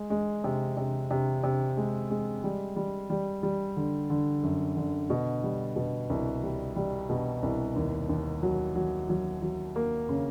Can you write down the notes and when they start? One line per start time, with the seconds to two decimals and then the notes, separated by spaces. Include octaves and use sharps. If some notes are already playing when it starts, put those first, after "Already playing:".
Already playing: G#3
0.10 G#3
0.44 C3
0.77 C3
1.11 C3
1.44 C3
1.77 G#3
2.10 G#3
2.44 G3
2.76 G3
3.10 G3
3.43 G3
3.77 D3
4.10 D3
4.43 F#2
4.76 D3
5.10 B2
5.44 G3
5.76 B2
6.10 C2
6.43 G3
6.76 G3
7.10 B2
7.43 C2
7.76 D#2
8.09 D#2
8.43 F#3
8.75 F#3
9.09 F#3
9.42 F#3
9.76 A#3
10.09 C#3